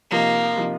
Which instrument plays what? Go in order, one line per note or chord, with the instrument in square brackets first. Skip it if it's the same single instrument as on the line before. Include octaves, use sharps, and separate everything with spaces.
[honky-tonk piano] C3 F3 D#4 [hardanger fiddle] A#3
[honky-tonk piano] C3 F3 D#4